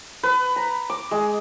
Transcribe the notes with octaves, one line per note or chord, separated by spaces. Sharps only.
B4
A#5
D6
G#3